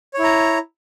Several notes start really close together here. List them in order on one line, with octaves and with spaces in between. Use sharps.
C#5 E4 A#5